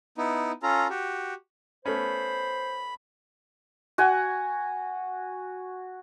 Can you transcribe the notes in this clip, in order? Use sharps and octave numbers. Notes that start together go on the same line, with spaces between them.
B3 D#4 E4
C#4 F4 A4 A#5
F#4 G4
A3 B3 C#4 C5 B5
F#4 G#5